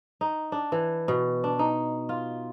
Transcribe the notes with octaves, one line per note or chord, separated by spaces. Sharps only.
D#4
D4
E3
B2
D4
D#4
F4